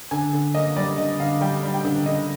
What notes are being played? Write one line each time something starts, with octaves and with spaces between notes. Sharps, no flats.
D3 G#5
D3
A#3 D#5
G3 D5
D3 D#5
D3 F5
G3 G5
G3
G5
D3
D3 D#5